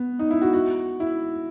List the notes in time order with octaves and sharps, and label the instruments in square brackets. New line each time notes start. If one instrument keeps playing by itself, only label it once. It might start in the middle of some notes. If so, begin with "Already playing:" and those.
Already playing: [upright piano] B3
D#4
E4
F#4
F#4
E4